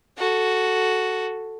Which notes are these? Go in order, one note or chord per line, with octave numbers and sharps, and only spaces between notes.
F#4 A4